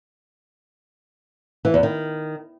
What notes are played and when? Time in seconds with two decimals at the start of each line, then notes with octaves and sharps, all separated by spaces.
1.65 E3
1.74 E2
1.83 D#3